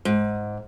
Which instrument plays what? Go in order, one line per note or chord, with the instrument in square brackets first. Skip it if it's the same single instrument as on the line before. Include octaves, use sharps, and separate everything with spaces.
[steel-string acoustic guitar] G#2